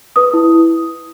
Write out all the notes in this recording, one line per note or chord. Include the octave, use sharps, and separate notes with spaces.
B4 D#6
E4